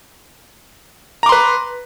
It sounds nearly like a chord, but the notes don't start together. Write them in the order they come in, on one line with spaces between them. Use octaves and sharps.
A#5 D6 C6 B4